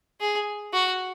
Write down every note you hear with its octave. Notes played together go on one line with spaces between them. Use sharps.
G#4
F#4